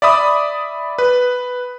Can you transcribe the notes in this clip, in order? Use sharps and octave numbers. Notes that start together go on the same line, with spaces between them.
D5 E5 B5 D#6
B4